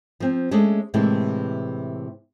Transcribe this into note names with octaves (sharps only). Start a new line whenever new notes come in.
F3 C4
G#3 A3 C#4 D4
A2 C3 E3 G#3 A#3 D4